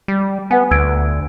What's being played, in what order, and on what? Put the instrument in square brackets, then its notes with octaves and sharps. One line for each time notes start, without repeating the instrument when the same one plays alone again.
[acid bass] G3
[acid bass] B3 [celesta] B4 F#5 G#5
[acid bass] D2 [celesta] E6 G#6 D7